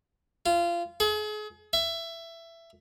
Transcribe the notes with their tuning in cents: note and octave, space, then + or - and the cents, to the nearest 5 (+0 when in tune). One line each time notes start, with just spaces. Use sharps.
F4 -25
G#4 +35
E5 +15